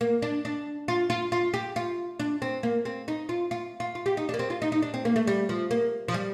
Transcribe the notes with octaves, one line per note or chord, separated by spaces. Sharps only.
A#3
D4
D4
F4
F4
F4
G4
F4
D4
C4
A#3
C4
D#4
F4
F4
F4
F4
G4
D#4
D4
A#3
C4
F4
D#4
D#4
D4
C4
A#3
A3
G3
F3
A#3
F3
G3